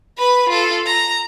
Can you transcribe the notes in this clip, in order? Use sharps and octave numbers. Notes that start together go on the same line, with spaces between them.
B4 B5
F4 A4
A#5